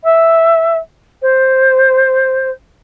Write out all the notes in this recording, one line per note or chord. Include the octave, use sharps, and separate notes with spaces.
E5
C5